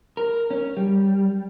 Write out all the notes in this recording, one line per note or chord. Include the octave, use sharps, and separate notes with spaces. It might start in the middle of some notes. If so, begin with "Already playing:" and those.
A#4
C#4
G3